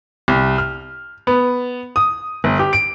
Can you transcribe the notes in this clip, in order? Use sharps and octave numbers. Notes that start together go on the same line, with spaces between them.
C2
F6
B3
D#6
G1
G4
D7